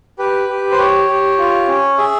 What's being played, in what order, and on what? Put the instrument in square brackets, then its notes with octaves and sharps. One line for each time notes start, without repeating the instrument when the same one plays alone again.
[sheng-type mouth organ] G4 B4
G4
C5
G4 C#5
G4
F4
C#4
G#4 E5